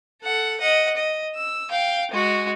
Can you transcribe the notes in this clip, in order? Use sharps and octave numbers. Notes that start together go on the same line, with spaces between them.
A4 F#5
D#5 F#5
D#5
E6
F5 G5
G#3 F#4